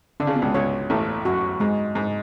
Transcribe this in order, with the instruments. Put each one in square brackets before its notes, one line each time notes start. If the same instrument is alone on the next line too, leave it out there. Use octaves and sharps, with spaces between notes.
[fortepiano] D3 [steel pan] D4
[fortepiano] C#3
B2
C#2 C#3
[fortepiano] C#2 C#3 [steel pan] C#5
[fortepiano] A1 A2 [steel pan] A4
[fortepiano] F#2 [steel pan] F#4
[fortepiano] G#2 [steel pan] G#3
[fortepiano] G#2 [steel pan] G#3